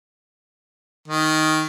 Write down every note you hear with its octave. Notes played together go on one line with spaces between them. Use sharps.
D#3